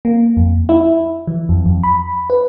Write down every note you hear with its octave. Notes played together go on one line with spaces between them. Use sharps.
A#3
F2
E4
E3
F2
F2
B5
B4